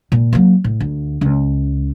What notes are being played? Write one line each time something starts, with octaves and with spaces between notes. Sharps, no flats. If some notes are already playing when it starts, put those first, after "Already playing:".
A#2
F#3 A#3
A2
D2
C#2